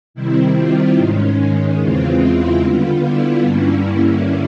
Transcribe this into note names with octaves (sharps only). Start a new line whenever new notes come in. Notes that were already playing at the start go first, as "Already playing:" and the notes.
C3 D#3 G3 C4 E4
F4
G#2 D#3 G#3 C#4
E2 C#3 E3 G#3 C4 F4
E4
D3 G3 B3 F4
E4
G2 D3 G3 A#3 C#4 E4